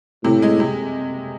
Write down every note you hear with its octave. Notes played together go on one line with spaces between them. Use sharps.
A2 C3
G#3
C3